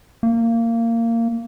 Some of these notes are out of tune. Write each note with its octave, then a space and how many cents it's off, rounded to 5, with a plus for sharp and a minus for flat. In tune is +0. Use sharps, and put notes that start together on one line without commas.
A#3 -20